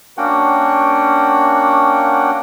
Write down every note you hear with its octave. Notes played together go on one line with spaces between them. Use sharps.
A#3 C#4 D4 F#4 F#5 G5